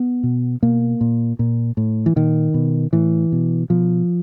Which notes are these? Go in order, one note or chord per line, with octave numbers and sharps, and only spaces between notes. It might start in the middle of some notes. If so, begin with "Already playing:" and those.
Already playing: B3
B2
B2 A#3
A#2
A#2
A2
E3
A#2 D#3
B2
A2 E3
B2
B2 F3